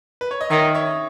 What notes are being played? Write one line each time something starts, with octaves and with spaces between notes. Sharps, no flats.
B4
C#5
D#5
D#3 C#5 E5
C#5 E5